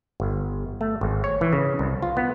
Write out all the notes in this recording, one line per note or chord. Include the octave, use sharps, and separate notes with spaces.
G1
A3
G#1
C#5
E3
C#3
C2
F4
B3